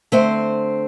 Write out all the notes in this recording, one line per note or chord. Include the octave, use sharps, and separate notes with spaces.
D3 A3 C4 C5